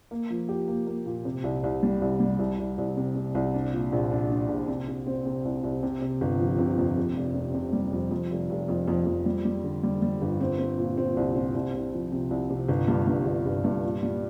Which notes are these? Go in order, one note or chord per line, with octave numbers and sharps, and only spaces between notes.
A#3
F3
G4
A#3
A#3
A#2
C3
C2
C2
G3
C2
G3
C2
C2
C2
C3
C3
C2
D4
A#2
A#1
D4
D4
A#1
C3
C3
C4
C3
C2
C2
C3
C3
G1
F3
C3
F2
C3
F1
C3
C3
G3
F2
F2
F1
F1
F2
F2
F2
G3
G3
D3
G3
G3
G1
C4
C4
A#2
C4
C2
C4
C2
C2
F3
C3
C2
C3
G1
G2
G2
G1
G1
G2
A#2
G3